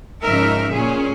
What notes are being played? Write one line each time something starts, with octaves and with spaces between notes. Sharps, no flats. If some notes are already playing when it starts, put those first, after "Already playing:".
G#2 C#3 F3 D#4 A#4 E5
A#2 C#4 G#4